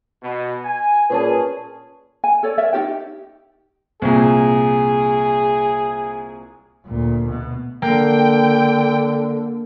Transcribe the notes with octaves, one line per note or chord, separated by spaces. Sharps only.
B2
G#5
A#2 C#4 G#4 B4 A5
G#5
A4 C#5 D5
A#4 C#5 D5 E5
D#4 F#4 G4 G5
C2 A#2 G#4
D2 A#2
B2
D3 A#3 G5